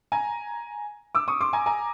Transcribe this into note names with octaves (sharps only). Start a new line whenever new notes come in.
G#5 A#5
D6 E6
C#6 D#6
C6 D6
G#5 A#5
G#5 A#5